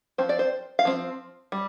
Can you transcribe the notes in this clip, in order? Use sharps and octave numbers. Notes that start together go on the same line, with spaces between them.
F3 C4 C5
D5
C5
F5
F3 C4
G3